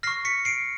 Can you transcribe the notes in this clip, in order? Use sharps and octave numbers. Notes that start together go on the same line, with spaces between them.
C#6 F6 A#6 C7
B6 C#7
C7 D7